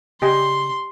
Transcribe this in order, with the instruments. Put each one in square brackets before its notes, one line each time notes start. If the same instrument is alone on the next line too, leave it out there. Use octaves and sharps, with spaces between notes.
[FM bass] C#3 [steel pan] G4 D#5 G#5 [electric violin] C6